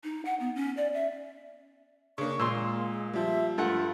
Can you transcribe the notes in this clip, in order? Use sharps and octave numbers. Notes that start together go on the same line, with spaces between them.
D#4
F#5
B3
C#4
D5
E5
C#3 A#3 D4 C#6
A#2 G#3 A#3 C6 E6
F3 G3 E5
G2 A3 F4 A4 F#5